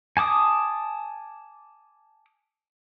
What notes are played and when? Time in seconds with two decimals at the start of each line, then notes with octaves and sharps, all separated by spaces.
0.17 G#5 A5 D6 D#6